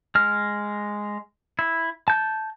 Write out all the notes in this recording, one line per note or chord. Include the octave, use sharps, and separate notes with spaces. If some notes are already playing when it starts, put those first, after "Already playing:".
G#3 F6
E4
A5 G6